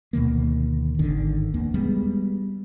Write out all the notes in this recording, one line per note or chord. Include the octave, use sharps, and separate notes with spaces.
D2 B2 D#3 A#3
G#1 D3 D#3
E2 A#3
G3 G#3 B3